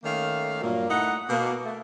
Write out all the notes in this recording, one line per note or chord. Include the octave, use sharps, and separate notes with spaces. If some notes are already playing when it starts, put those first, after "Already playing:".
D#3 A3 A#3 C#4 F5
G2 A#2 F#3 A#3
A3 D#4 E4 F#5
B2 A#3
A3